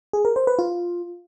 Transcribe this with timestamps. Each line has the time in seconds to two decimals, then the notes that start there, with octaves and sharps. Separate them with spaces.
0.13 G#4
0.25 A#4
0.36 C5
0.47 B4
0.59 F4